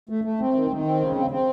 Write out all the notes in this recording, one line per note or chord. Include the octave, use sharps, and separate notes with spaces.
A3
A3
C4
D#3
D#3
C4
C#3
C4
C4